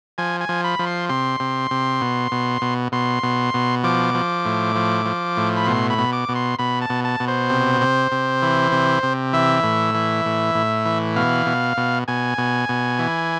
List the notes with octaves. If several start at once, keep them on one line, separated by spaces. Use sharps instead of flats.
F3 G#5
G#5
F3
B5
F3
C6
C3 C6
C3
C3
B2
B2
B2
B2 C6
B2
B2
F3 D6
F3
A2
F3
F3
A2
B5
B2 C6
B5
B2
D6
B2
C6
B2 B5
A5
B2
A5
B2
C5
C3
C3
C3
E3
C3
C3
E3 E5
A2
E3
A2
A2
E3
B2 F5
B2
B2
B2 G#5
B2
B2
E3